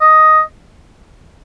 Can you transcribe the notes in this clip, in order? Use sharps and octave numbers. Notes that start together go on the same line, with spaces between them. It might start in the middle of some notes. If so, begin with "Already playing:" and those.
D#5